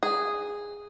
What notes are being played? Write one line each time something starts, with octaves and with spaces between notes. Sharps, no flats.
G#4